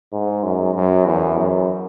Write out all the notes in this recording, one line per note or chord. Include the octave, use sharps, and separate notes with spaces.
G#2
F#2
F#2
E2
F#2